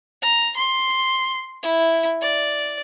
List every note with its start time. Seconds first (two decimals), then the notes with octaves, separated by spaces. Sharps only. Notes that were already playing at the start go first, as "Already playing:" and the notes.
0.22 A#5
0.56 C6
1.63 E4
2.22 D5